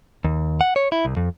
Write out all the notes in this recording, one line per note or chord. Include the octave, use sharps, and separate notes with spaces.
D#2
F#5
C#5
E4
C2
F2